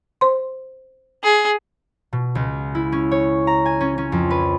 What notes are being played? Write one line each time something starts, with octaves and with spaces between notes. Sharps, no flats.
C5 C6
G#4
B2
C#2
E4
C#4
C#5
A#5
G#5
C#4
C#4
F2
B4